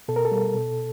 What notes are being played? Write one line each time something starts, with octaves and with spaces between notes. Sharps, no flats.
B2 A4
A#4
A4
G3
B2